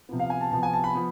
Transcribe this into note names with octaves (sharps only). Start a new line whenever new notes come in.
C3 F3 B3
F5
G#5
A5
C3 F3 B3 A5
G#5
A5
B5
F3 B3